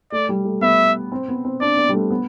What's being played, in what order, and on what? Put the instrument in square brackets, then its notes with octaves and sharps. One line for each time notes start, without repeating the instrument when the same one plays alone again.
[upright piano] A3 [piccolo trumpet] D5
[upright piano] G3
A3
[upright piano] B3 [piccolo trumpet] E5
[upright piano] C4
B3
C4
[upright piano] D4 [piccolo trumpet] D5
[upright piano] B3
G3
A3
B3